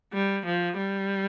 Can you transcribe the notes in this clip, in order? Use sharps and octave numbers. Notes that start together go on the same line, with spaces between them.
G3
F3
G3